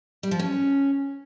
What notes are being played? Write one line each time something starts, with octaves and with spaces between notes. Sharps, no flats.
G3
F3
C#4